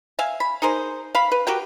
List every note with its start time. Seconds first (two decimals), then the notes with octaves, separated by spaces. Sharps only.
0.19 E5 F5 G#5
0.40 B5
0.62 D#4 G#4 A#4 C5
1.15 F5 B5
1.31 B4
1.47 F#4 G4 A#4 G5